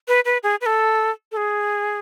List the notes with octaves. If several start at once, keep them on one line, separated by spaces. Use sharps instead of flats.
B4
B4
G#4
B4
A4
A4
G#4